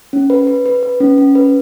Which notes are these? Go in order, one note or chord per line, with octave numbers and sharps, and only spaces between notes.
C#4
B4
B4
B4
B4
C#4
C#4
B4